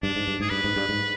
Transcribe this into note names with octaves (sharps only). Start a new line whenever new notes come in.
G2 D4
G#2
G2
G#2 G#4
G2 B4
G#2
G2
G#2